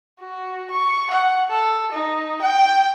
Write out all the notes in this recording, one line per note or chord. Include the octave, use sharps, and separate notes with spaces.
F#4
C#6
F#5
A4
D#4
G5